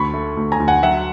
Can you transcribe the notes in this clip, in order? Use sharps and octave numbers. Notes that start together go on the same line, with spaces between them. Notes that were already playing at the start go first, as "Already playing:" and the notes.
Already playing: D2 B5 C#6
A3
D2
G#5 A#5
D2
F#5 G#5
F#3 E5 F#5